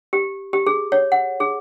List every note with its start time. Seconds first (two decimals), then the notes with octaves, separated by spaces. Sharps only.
0.13 G4
0.53 G4
0.67 G#4
0.92 C#5
1.12 F#5
1.40 G#4